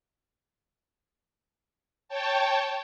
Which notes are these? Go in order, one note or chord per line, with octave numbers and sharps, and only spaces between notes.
C#5 G5 A5